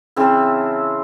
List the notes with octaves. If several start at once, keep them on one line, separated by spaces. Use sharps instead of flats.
C#3 E3 C4 A4